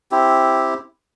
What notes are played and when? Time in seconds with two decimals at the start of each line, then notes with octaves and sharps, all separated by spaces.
0.12 C4 E4 G4